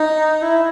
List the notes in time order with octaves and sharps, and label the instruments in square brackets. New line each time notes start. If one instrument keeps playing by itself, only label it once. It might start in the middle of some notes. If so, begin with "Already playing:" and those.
Already playing: [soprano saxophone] D#4
E4